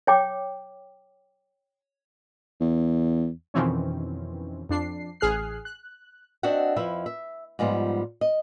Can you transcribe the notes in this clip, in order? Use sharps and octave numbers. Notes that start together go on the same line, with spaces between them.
C#5 G5 D6
E2
F2 B2 D#3 E3 C4 C#4
F2 D4 C7
A1 G#4 F6 F#6 C7
F#6
C4 D4 F#4 D#5 E5 F#5
F2 F3 E4 B4 E5
E5
G#2 F3 G3 B3 F4
D#5